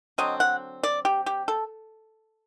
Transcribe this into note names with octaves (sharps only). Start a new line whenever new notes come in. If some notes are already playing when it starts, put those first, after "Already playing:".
D3 F#3 C4 D#5
F#5
D5
G4
G4
A4